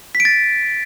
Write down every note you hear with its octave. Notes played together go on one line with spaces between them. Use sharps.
B6
D7
A6